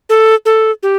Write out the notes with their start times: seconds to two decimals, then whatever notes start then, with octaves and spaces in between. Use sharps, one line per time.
0.09 A4
0.45 A4
0.83 G4